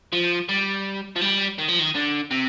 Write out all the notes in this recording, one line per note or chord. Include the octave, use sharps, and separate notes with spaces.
F3
G3
F3
G3
D#3
F3
D#3
D3
C3